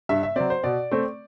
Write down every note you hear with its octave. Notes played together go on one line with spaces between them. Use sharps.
G2 E5
E5
F#3 C4 D5
C5
B2 D5
A3 C4